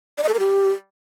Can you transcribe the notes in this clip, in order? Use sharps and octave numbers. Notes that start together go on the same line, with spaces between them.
D5
D#5
A4
A#4
G4